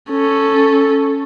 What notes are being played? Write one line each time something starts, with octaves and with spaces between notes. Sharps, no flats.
C#4 A4